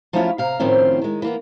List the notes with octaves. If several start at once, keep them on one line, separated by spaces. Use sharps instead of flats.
F3 F#3 A3 C#4 E4 F4
C3 F5 A#5
A2 D#3 F3 C4 C#4
D#3 G#3
E3 A#3 B3